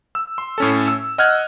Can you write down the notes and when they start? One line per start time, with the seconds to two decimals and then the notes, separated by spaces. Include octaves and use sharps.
0.15 E6
0.38 C6
0.58 A2 C#4 A4
0.88 E6
1.18 D#5 F#5 F6 F#6 G#6